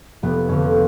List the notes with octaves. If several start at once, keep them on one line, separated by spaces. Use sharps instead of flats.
F1 B3
F2 D3 F3 C#4